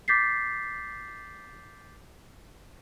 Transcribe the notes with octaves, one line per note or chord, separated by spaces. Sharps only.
D6 G6 A6 B6 C7